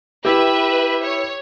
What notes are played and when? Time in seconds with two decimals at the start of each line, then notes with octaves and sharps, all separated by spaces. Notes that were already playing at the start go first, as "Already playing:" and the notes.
0.25 E4 G4 B4 E5
1.04 C#5